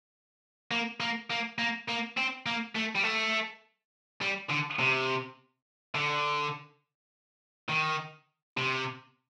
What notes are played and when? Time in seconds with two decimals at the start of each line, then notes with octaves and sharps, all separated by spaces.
0.71 A#3
1.00 A#3
1.31 A#3
1.58 A#3
1.88 A#3
2.17 C4
2.46 A#3
2.76 A3
2.96 G3
3.04 A3
4.21 G3
4.49 D3
4.79 C3
5.95 D3
7.69 D#3
8.57 C3